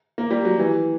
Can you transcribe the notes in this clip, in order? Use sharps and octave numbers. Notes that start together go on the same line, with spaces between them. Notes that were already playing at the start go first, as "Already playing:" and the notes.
A#3
G3
F#3
E3